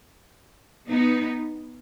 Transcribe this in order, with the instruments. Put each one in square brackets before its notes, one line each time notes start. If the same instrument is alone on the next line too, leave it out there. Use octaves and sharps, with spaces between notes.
[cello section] B3 D#4